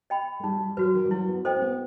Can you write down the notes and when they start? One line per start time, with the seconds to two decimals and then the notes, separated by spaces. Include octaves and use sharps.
0.10 D#5 G5 B5
0.40 A3
0.44 G3 D#4
0.60 G3
0.77 F#3 F#4 B4
0.94 D#3
1.05 G3
1.11 F#3 E4
1.28 B3
1.44 B3 A4 C5 D#5 G5
1.56 C4
1.62 B3